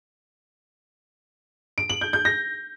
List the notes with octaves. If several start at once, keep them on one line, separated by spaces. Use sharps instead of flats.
D7
F#7
G6
G6
A#6